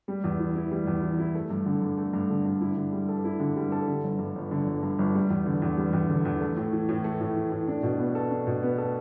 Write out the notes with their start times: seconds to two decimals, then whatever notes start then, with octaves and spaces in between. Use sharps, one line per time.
0.08 G3
0.24 E2
0.40 E3
0.55 E4
0.71 G3
0.87 E2
1.03 E3
1.19 E4
1.35 A3
1.50 G2
1.66 D3
1.82 G2
1.98 A3
2.13 G2
2.30 D3
2.45 G2
2.61 E4
2.77 D3
2.92 G3
3.09 A4
3.25 E4
3.40 D3
3.56 G3
3.72 A4
3.88 D3
4.04 G1
4.19 G2
4.36 G1
4.51 D3
4.67 G1
4.83 G2
4.99 G1
5.15 G3
5.30 E2
5.46 D3
5.62 E2
5.77 G3
5.93 E2
6.09 D3
6.25 E2
6.41 A3
6.57 A2
6.73 E3
6.89 A2
7.04 A3
7.20 A2
7.36 E3
7.52 A2
7.68 D4
7.83 B2
7.99 B3
8.15 A4
8.31 D4
8.47 B2
8.63 B3
8.78 A4